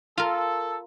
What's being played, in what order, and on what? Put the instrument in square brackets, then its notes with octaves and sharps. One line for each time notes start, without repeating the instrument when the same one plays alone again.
[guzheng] F4 A#4 [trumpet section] A4